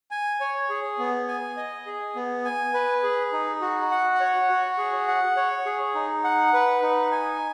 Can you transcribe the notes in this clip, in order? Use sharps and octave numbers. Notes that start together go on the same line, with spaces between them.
G#5
C#5
G#4
B3
G#5
D#5
G#4
B3
G#5
B4
G#4
D#4
F#4
F#5
C#5
F#4
G#4
F#5
C#5
G#4
D#4
F#5
B4
D#4
G#5